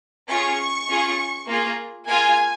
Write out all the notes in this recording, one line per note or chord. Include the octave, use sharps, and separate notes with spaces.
C#4 F4 G#4 C#6
C#4 F4 G#4
A#3 F4 G#4
A#3 F4 G#4 G#5